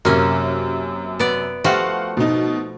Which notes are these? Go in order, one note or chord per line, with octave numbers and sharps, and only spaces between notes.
F#2 C3 A#3 C#4
B3 D5
F3 A3 F#4 G4 F5 F#5
B2 D#4